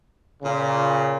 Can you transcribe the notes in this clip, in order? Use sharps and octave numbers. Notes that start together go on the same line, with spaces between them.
A#2 C#3